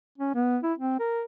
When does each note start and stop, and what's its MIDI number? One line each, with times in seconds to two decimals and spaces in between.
0.18 0.34 61
0.35 0.58 59
0.63 0.73 64
0.78 0.99 60
1.00 1.23 70